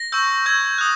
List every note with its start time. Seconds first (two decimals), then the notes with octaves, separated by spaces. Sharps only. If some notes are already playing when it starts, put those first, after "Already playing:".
Already playing: A#6
0.12 C#6 E6 G6
0.46 C#6 E6 G6 G#6
0.78 D#6 F#6